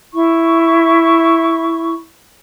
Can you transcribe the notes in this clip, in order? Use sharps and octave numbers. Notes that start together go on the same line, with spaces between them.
E4 C#6